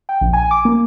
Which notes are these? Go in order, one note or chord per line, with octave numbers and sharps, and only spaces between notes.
G5
A#1
G#5
D6
A#3